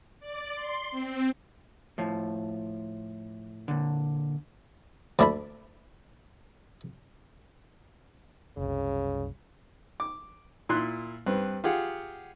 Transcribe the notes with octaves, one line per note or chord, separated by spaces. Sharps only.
D5
C6
C4
A2 F3
A#2 D3
D2 D4 E4 A5 B5
F#1 C2 C#3
D6
A#2 E4 C6 F#6
G2 C4 B4
F4 G4 G#4 F#5